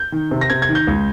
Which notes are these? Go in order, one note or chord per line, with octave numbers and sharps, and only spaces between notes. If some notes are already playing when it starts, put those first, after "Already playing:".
Already playing: G6
D#3
C3
A#6
C3 G#6
G#6
D#3
G6
C#2